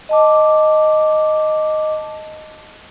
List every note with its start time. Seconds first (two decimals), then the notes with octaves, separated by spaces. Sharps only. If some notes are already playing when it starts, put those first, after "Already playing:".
0.09 D#5 A5 D6